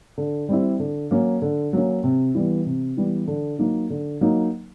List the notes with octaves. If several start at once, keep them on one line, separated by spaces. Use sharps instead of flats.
D3
G3 C4 E4
D3
F#3 A#3 C#4
D3
F#3 A#3 C#4
C3
E3 G3 B3
C3
E3 G3 B3
D3
F#3 A#3 D#4
D3
F#3 A#3 D#4